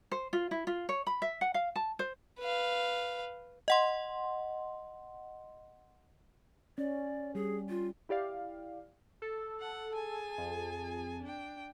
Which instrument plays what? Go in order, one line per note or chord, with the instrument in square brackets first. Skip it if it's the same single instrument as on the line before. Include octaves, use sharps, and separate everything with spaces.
[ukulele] C5
F4
E4
F4
C#5
B5
E5
F#5
F5
A5
C5
[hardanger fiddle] B4 F5
[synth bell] D#5 F#5 C6
[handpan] C#4 [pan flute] D5
[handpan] G3 [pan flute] G#4
[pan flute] F4
[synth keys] E4 G4 D5 F5
[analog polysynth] A4
[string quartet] F#5
G#4 G#5 A5
[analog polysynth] F2
[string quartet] D4 G5